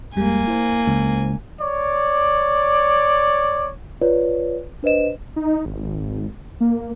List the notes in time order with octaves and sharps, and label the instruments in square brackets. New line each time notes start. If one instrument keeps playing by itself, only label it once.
[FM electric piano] F2 G3 G#3 [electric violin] A#3 G#5
[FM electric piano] E4 C5
[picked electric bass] C#2
[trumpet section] C#5 D5
[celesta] F4 B4 C#5 D5
D4 B4 C5 D#5 E7
[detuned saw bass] D#4
G#1
A#3